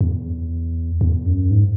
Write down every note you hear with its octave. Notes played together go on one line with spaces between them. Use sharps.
E2
E2
F#2
G#2